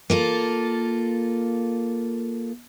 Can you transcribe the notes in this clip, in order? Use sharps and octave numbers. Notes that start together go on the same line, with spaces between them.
A#3 F4 A4